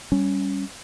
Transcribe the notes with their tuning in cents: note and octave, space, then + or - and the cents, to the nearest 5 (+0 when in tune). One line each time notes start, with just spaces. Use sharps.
G3 +0 C#4 +0